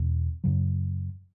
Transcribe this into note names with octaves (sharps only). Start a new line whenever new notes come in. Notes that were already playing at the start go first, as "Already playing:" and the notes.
Already playing: E2 B2
F#2 C#3 F#3